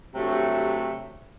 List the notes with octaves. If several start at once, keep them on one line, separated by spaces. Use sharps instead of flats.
G2 C3 F#3 A3